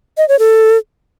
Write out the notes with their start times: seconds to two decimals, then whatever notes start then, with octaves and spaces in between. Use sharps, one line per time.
0.18 D#5
0.28 C#5
0.39 A4